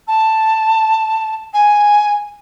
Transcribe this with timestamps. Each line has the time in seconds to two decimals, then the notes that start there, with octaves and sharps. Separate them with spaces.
0.07 A5
1.53 G#5